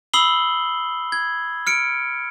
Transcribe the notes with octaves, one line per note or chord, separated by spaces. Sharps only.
B5 D#6 E6 C7 F#7 G7
G#6
F6 C#7 D7